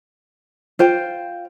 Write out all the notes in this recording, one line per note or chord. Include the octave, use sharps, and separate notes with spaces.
F4 C5 G5